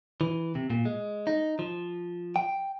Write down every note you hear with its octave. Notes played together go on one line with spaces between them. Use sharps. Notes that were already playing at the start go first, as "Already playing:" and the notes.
E3
C3
A#2
G#3
D#4
F3
G5